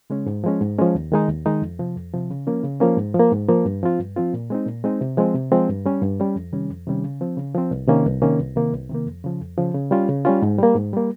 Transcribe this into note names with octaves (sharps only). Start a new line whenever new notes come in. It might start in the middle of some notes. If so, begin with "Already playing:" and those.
C#3 G#3 C#4
G#2
F3 G#3 C#4
G#2
F3 G#3 C#4
D#2
D#3 G#3 D#4
D#2
D#3 G#3 D#4
F2
C3 F3
F2
C3 F3
C#3
F3 A#3 C#4
C#3
F3 A#3 C#4
G#2
F3
A#3
G#2
F3 A#3
G2
F3 C4 F4
G2
F3 C4 F4
A#2
G#3 C4 D#4
A#2
G#3 C4 D#4
C3
F3 G#3 C4
C3
F3 G#3 C4
G2
G3 C#4
G2
G3 C#4
F2
C3 D#3 G3 C#4
F2
C3 D#3 G3 C#4
C#3
F3 C4
C#3
F3 C4
C2
C3 D#3 A#3 C#4
C2
C3 D#3 A#3 C#4
C2
C3 D#3 A#3
C2
C3 D#3 A#3
F2
C#3 F3
F2
C#3 F3
C#3
G3 C#4 F4
C#3
G3 C#4 F4
G#2
G3 A#3
G#2
G3 A#3